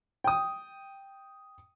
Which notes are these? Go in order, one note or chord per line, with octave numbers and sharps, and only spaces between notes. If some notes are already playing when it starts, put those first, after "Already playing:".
G5 D#6